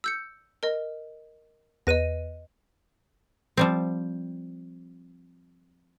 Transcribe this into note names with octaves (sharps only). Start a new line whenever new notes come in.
E6 G6 C#7
A#4 D#5
E2 B4 D#5 A#6 D#7
F3 G3 C4